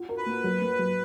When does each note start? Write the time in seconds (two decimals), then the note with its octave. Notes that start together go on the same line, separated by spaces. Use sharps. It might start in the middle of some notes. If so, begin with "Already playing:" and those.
Already playing: F4 F#4
0.09 A#4
0.17 B4
0.26 A#3
0.44 F#3
0.61 A#3
0.79 F#3